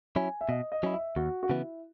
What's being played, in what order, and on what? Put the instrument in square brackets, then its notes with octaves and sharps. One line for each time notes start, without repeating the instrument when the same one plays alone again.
[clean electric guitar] F#3 C#4 E4 [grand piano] G#5
[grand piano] E5
[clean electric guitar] B2 [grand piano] D#5
[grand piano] D#5
[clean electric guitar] F#3 C#4 E4
[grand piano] E5
[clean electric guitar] D#2 [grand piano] F#4
[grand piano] F#4
[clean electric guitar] C#3 E3 B3 [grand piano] E4